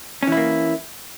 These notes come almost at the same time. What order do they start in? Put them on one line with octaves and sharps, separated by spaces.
C#4 E3 E4 A#3